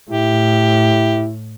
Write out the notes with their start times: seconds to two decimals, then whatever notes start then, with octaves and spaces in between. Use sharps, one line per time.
0.10 A2 E4 G4